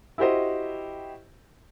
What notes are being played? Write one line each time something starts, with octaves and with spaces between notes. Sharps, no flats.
E4 F#4 G4 C5 D#5